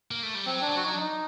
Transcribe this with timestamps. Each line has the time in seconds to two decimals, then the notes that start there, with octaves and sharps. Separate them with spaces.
0.11 A#3
0.23 A3
0.35 G3
0.46 F#3 C4
0.61 D4
0.69 F#3
0.77 F#4
0.84 D#4
0.92 D4
0.99 D#4